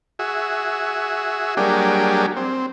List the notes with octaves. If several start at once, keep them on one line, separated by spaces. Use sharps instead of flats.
F#4 G#4 E5
F#3 G3 A#3 D4 G4 G#4
C4